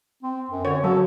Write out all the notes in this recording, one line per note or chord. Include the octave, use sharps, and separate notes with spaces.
C4
F#2
D3 C#5
F#3 A4